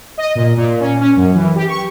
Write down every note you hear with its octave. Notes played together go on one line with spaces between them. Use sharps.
D#5
A#2
A#2
C#4
C#4
F#2
E3
G4
C#6